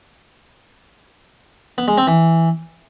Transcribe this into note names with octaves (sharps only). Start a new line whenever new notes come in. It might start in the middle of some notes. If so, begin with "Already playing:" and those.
B3
G#3
C4
E3